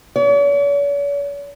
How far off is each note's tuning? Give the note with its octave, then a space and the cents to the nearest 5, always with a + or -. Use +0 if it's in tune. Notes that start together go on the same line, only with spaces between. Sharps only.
C#5 +45